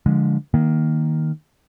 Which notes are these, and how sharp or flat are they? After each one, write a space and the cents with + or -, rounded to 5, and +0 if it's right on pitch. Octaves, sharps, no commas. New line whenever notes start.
D3 +0 F3 +15 G#3 +0
D#3 +0 A#3 +0